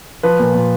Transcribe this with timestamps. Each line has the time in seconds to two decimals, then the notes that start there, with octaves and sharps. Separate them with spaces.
0.23 F3 B4
0.39 A#2
0.55 A#2